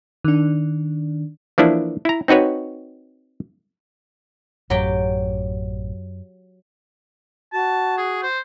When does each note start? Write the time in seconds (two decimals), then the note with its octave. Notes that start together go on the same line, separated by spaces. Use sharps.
0.24 D#3 D4
1.58 E3 F3 A#3 D4 E4
2.05 E4 A#5
2.28 C4 D#4 F#4 B4 C#5
4.70 A1 F#2 F#3 G4 G5
7.53 F#4 A5
7.98 G#4
8.23 C5